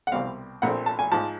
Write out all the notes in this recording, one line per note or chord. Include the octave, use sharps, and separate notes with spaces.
F#5
C2 B2 G3 C4 F5
A#1 A#2 F3 A3 C4 F#5
A5
G#5
G#2 F3 A5